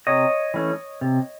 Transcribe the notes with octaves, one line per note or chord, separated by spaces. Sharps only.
C3 C#5 D#5
E3 A3 C#4
C3